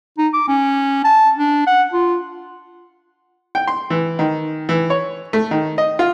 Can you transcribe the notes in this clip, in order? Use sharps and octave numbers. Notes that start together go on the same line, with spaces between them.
D#4
D6
C#4
A5
D4
F#5
F4
G5
C6
E3
D#3
E3
C#5
A3
D#3
D#5
F4